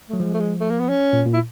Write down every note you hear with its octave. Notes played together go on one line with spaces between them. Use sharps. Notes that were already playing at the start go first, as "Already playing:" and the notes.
F#3 A3
F3 G#3
A3
G#3
A3
A#3
B3
C#4
A#2
A#2
E4